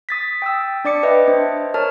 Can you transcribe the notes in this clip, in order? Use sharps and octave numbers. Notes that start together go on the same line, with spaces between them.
D#6 A6 B6
G5 D#6 E6
D4 D5 D6 C#7
B4 D#5 E5 G5
D4 C5
A#4 C#5 A5 F6